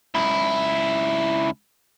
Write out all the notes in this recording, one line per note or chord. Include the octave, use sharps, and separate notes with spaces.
C#2 E4